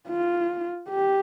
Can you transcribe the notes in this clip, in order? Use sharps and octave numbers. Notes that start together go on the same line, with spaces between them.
F4
G4